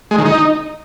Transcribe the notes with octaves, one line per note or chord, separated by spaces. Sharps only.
G#3
D#3
D#4